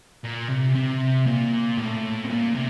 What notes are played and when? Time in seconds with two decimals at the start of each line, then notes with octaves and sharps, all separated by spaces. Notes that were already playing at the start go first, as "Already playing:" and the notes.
0.24 A#2
0.50 C3
0.76 C3
1.27 A#2
1.78 A2
2.24 C3
2.29 A#2
2.54 C3